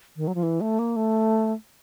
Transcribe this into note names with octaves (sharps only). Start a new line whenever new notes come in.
D#3
F#3
F3
E3
A3
A#3
A3